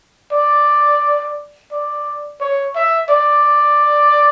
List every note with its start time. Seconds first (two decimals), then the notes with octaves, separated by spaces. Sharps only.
0.32 D5
1.72 D5
2.41 C#5
2.75 E5
3.10 D5